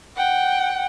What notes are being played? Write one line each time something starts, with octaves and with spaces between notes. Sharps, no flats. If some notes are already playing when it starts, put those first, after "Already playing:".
F#5 G5